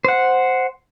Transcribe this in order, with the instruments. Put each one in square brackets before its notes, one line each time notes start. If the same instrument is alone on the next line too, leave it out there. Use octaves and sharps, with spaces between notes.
[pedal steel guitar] C5 F#5